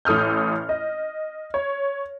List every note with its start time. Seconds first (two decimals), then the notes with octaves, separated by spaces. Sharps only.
0.05 A1 A4 D#6 F6 G6
0.69 D#5
1.54 C#5